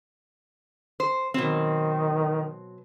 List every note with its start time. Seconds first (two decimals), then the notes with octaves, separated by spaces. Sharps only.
1.00 C5
1.34 B2 D#3 F#3 C4